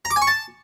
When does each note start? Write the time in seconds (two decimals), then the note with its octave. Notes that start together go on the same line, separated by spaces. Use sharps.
0.05 A#5
0.11 D6
0.16 G#5
0.22 C#6
0.27 A5